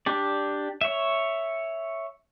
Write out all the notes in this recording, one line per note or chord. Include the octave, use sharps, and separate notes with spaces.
D4 G4 D5
C#5 E5